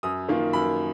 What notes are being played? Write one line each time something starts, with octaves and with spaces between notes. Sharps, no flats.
F#2 D#6
D#3 A#3 F4
F#2 B5